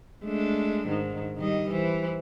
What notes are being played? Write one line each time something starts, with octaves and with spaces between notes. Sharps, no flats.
G#3 A3 D4
G#2 D#3
D#3 G3 D#5
E3 C5